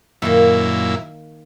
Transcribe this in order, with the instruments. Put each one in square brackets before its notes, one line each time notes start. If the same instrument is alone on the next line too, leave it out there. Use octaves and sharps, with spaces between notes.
[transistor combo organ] F#2 A#2 E4 [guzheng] D#3 A#3